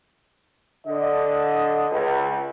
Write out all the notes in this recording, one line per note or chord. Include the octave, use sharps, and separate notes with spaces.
D3 D#5
C#2